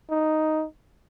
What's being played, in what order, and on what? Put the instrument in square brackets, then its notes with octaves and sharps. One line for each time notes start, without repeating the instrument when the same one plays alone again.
[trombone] D#4